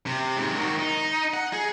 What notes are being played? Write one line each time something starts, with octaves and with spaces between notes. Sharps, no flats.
C3
G#2 C3
D#3 F#4
D#4
F#5
G#4